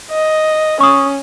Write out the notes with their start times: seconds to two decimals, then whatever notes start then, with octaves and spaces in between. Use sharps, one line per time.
0.11 D#5
0.81 C#4 C#6 D#6